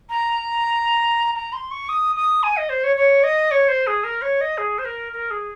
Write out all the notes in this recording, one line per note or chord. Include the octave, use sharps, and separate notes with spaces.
A#5
A#5
C6
C#6
D#6
D#6
G#5
D#5
C5
C#5
C#5
D#5
C#5
C5
G#4
A#4
C#5
D#5
G#4
C5
A#4
A#4
G#4